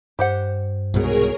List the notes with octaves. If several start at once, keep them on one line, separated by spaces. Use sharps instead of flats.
G2 G4 C5 F#5
C2 G#2 B2 G#4 A#4 C#5